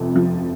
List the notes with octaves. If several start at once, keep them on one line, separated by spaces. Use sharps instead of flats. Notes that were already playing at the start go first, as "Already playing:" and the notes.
Already playing: F1 F2 C3
F3